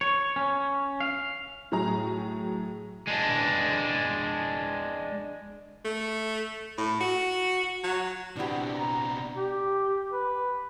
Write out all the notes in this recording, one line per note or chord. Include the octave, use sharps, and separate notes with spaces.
C#5
C#4
F5
A2 F#3 G#4 A#5
G#3 D4
A3
A2
F#4
F#3
B2 B3 C4 D4 E4 G4
A#5
G4
B4